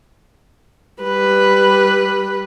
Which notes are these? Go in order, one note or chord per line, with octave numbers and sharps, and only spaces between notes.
G3 B4